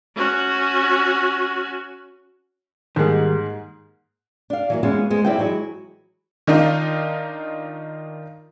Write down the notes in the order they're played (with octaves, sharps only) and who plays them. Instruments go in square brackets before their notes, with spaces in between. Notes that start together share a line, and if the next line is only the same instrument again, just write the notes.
[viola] C#4 F#4
[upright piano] G#2 A#3 G#4 [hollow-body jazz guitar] D#3 G3
[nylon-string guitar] D4 F5
E3 F#3 A#3
E3 G#3 B3 C#4 F4
G#3 B3 C5
G3 C4 E4 F4 G5
E3 F#3 G#3 E4 G#4
[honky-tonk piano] D#3 D4 D#4 F4